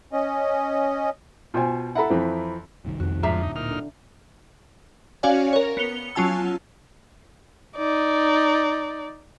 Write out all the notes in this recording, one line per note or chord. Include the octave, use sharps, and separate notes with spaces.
C#4 D#5
B2 F4 C5 G5 G#5
E4 A4 F#5 A#5 B5
F2 E3 C4
F#1 C2 D#3
F2 F#4
D1 G#2 F3 D4 E5 A#5
D#4
A#2 D#4 F6
D3
C#4 F#4 C#5 D5 F5 G#5
A#4 C#5
B3 C#7 F7 G7
F#3 C#4 F4 G#5 A5 E6
D#4 D5